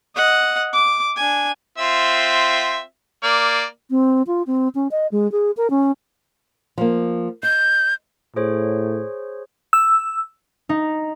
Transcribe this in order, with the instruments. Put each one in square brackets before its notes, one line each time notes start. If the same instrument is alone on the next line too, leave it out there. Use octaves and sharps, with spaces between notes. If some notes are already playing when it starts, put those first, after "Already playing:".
[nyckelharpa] D#5 F#5
D6
D4 G#5
[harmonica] C4 F4 E5
A#3 D5
[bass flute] C4
F4
C4
C#4
D#5
G#3
G#4
A#4
C#4
[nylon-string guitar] F3 A#3
[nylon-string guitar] D#5 [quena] G6
[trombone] A2 [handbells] G#4 C5 C#5
[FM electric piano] E6
[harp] D#4